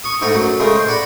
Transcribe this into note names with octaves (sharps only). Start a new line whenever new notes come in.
C#6 D#6
G#2 A3 D#4 F#5 A#5
F#2 F#3
C#3 G#3 A3 A#4
C5
D5 F#5 A#5 B5